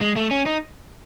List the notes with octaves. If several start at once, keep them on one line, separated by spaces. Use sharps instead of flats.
G#3
A3
C#4
D#4